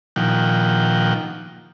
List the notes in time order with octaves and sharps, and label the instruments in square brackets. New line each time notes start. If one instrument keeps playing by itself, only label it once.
[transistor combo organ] A#2 D#3 F3 F#5 G5